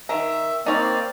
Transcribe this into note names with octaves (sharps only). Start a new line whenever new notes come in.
D#3 E5 A#5
A#3 C4 D#4 C#5 D5